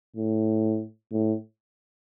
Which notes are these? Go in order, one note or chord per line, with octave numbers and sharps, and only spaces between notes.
A2
A2